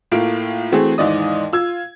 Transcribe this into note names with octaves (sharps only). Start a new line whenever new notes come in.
A2 A3 A#3 F4 F5 D7
E3 A3 C4 F#4 G#4
D#2 G#2 E3 D5 D#5 D#6
F4 E6 G#6